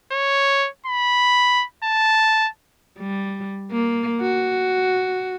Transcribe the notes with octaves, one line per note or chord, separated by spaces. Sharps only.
C#5
B5
A5
G3
A#3
F#4